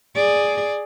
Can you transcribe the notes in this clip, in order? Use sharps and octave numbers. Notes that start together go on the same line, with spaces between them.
G#4 D5